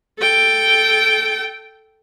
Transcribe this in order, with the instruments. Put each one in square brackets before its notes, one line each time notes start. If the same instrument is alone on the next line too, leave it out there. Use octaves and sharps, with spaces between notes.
[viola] A4 G5